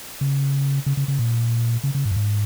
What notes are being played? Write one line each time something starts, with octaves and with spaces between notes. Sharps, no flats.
C#3
C#3
C#3
C#3
A#2
C#3
C#3
G#2
F#2
G#2